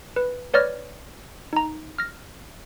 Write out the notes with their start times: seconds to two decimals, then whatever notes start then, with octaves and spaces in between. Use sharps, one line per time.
0.16 B4
0.54 B4 C#5 D5 F6 A#6
1.53 D#4 A#5
1.98 F6 A#6